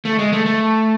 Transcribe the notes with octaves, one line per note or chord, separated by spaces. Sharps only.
A3
G#3
A3
A3